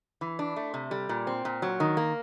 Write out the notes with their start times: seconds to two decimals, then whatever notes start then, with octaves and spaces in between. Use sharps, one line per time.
0.21 E3
0.39 D4
0.56 A3
0.74 C3
0.91 G3
1.09 A#2
1.27 C4
1.45 A#2
1.62 F#3
1.80 D#3
1.97 A#3